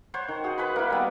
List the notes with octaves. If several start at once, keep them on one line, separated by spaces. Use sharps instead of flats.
C5 C#5 F#5
D#3
F#4 G#4
B4 F#5 G#5 B5
A#3 E4
G3 B3